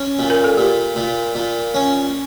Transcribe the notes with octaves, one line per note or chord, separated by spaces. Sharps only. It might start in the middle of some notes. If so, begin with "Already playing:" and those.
Already playing: C#4
A#2
A#4
A4
A#2 G4
A#2
A#2
C#4